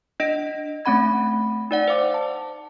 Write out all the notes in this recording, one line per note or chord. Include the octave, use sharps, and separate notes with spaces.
D4 D#5 A#6 D7
A3 C4 C#4 F#5 B5 G#6
D#4 D5 F#5
C5 F5 D6
A5